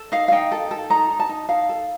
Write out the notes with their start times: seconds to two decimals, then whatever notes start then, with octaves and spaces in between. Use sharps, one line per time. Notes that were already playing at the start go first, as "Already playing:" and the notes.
Already playing: A4
0.12 D#4 F5
0.28 F5
0.32 D#4 G5
0.51 A4
0.71 A4
0.90 D#4 A#5
1.10 D#4
1.20 A5
1.29 D#4
1.49 D#4 F5
1.69 A4